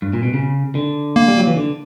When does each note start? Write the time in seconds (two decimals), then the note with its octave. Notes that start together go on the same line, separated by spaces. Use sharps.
0.02 G2
0.13 A#2
0.23 B2
0.34 C#3
0.75 D3
1.16 A#3
1.28 G3
1.37 F#3
1.47 E3
1.56 D3